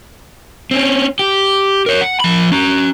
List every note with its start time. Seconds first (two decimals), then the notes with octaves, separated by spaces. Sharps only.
0.71 C4 C#4
1.19 G4
1.86 A#4 C#5
2.01 F#5
2.20 F3 B5
2.52 C#4 A#5